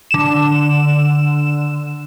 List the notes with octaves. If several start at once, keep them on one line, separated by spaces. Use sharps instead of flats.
D3 E7